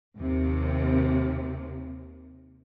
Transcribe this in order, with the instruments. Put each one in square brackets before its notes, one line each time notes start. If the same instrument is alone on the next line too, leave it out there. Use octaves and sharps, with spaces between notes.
[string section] D#2 C3